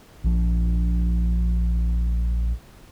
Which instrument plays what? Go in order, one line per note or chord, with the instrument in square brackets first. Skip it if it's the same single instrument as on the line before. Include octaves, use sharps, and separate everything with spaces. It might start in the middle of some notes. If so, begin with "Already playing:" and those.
[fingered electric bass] A#1 F3